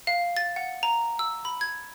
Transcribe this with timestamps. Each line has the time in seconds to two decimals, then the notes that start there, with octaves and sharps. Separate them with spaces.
0.07 F5
0.37 A6
0.56 F#5
0.83 A#5
1.19 E6
1.45 B5
1.61 G#6